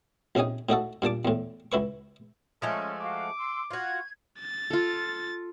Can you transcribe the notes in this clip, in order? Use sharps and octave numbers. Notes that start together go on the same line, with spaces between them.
A#1 C3 C#4 D#4 G#5
A2 D#4 F#4 A4
G2 A#2 A5 D6
E2 A2
C#2 E4 B4 C#6
F3 G#3 A3 C#4 A4
F#4 F5 D6
C6 E6
F4 F#4 G#6
A6
F4 A4